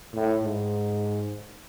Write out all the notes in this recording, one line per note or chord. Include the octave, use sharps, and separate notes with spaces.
A2
G#2